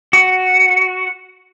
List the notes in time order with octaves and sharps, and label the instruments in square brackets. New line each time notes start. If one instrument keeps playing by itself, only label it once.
[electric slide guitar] F#4